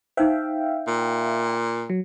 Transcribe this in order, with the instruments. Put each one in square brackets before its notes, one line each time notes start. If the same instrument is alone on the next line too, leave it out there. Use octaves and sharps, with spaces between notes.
[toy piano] D#4 C5 [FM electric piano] E5 F5 G5
[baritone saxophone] A#2
[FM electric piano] F#3